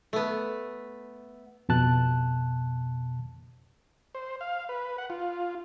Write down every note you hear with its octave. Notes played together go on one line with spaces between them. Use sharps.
A3 B3
F2 B2 A5 F#6
C5
F5
B4
F#5
F4